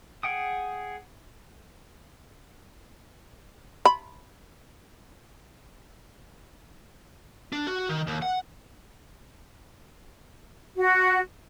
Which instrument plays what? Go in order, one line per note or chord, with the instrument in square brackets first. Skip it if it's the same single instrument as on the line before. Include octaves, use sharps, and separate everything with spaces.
[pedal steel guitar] G#4 F#5 G5 D#6
[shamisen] B5
[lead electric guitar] D4
F#4
D#3
D#2
F#5
[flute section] F#4